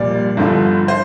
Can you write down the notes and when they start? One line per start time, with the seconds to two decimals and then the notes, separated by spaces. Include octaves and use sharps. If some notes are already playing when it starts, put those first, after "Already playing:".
Already playing: A#1 A#2 G3 D5
0.37 G1 G2 D3 F3
0.88 C5